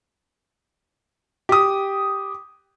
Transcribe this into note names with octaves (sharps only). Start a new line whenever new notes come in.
G4 D#6